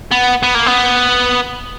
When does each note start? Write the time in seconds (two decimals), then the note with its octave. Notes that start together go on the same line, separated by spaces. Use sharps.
0.11 B3
0.43 B3
0.55 A#3
0.66 B3